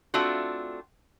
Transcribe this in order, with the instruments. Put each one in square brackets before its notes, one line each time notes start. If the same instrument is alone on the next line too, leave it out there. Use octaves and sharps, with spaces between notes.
[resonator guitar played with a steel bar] A3 C4 D4 F4 F#4